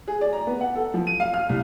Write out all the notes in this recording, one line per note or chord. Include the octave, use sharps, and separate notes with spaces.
G#4
D5
A#5
B3
F#5
A4
F3
D#7
F5
F6
C2